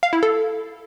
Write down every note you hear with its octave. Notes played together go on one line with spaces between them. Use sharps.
F5
E4
A4